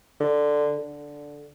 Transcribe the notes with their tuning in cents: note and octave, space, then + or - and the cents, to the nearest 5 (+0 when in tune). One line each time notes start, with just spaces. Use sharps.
D3 +5
D3 -5